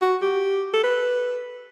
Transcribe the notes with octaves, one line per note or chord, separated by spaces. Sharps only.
F#4
G4
A4
B4